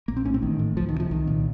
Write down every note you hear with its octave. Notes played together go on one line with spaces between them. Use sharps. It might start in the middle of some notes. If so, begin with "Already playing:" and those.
A#1 A#3
C4
A2 C#4
C4
A1 D#3
A2
C#2 F3
D#3
C3
F3
C2 D#3
A#2